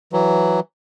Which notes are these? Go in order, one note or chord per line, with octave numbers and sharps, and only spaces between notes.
E3 F#3